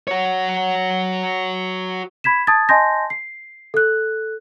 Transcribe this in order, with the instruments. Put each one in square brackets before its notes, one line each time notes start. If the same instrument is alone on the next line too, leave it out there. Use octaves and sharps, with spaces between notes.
[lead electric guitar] F#4 C#5
[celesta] B5 G#6 B6 E7
A5 D#6 G#6 A6
D#5 G#5 A5 C6 G6 A#6
C7
A4 F#6